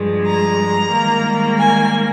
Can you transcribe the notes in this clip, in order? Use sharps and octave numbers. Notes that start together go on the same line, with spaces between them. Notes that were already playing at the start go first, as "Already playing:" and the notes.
Already playing: G2 F3 G#3
A#5
G#2 D#3 G3 A#3
G#5